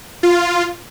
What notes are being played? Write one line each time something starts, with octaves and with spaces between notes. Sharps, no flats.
F4